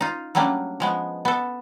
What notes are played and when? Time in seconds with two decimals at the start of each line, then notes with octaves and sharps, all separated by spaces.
0.01 D#4 F4
0.35 F#3 G3 A3 A#3 C#4 D4
0.80 F3 G#3 B3
1.25 B3 A4